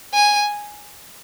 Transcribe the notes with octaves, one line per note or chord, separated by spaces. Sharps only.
G#5